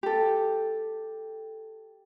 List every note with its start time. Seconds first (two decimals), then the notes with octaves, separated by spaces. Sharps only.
0.03 G4 A4